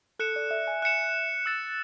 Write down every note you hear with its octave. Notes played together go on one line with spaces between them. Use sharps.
A4 F#6 C#7 E7
D5
E5
G#5
E5 F#6 C#7 E7
E6 A6 C#7 E7